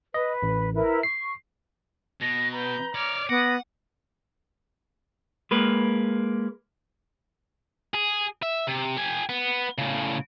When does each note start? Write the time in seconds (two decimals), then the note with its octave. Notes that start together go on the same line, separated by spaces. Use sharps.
0.14 B4 D#5
0.43 A1
0.75 E4 A#4 B4
1.03 C#6 C7
2.21 B2 A#6
2.52 B4 A#5 G6
2.95 C#5 D5 D6 F6
3.29 B3 F#5 A#6 D#7
5.51 G#3 A#3 B4
7.94 G#4
8.43 E5
8.67 C3
8.97 G4 G#5
9.29 B3
9.78 A2 C#3